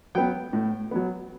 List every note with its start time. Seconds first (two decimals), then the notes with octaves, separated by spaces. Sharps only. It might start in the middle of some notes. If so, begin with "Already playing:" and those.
0.15 F#3 B3 G5
0.53 A2
0.91 F#3 B3